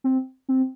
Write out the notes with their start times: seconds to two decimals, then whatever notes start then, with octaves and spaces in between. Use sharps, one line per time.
0.04 C4
0.49 C4